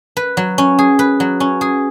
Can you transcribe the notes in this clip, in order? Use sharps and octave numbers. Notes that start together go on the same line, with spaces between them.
B4
F#3
C#4
G#4
B4
F#3
C#4
G#4